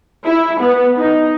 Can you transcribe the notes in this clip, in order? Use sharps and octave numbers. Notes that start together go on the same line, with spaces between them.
E4
B3
D#4